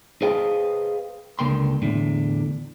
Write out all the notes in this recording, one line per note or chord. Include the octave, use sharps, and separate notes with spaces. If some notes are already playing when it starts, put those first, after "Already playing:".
G#4 B4 C5 D#5 F5 G5
C#2 D3 D#3 A#3 G5 C6
E2 A2 D3